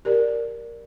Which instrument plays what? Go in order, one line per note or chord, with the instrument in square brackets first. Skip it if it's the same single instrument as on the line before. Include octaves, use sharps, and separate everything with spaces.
[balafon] G4 A#4 D5